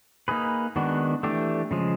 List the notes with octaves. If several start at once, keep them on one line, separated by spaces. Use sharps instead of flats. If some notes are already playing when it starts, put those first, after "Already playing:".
A#3 D#4 G#4 B4
D#3 G#3 B3 D4 F#4
E3 A3 D4 G4
C#3 F3 G#3